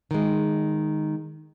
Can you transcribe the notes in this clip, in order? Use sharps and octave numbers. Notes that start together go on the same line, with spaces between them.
D#3 G#3